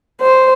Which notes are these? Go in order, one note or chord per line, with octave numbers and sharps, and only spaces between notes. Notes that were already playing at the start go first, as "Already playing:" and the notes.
C5